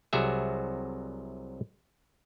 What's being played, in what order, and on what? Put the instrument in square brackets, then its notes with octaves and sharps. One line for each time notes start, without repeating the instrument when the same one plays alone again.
[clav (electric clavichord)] C2 C3 F#3 F#4 G#4 E5